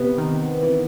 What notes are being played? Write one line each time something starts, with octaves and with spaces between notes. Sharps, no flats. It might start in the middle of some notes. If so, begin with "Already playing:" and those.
Already playing: C3 B3
D#3
E3